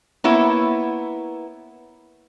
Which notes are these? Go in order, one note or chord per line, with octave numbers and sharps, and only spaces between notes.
A#3 B3 E4 C#5